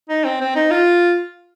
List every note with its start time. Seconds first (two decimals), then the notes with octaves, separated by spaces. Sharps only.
0.09 D#4
0.25 C4
0.41 C4
0.56 D#4
0.71 F4